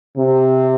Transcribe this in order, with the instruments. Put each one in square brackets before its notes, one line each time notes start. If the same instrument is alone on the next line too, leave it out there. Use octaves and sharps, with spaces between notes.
[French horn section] C3